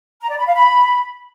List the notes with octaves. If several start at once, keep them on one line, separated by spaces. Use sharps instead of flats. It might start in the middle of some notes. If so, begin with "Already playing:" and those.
A#5
D5
B5
F5
B5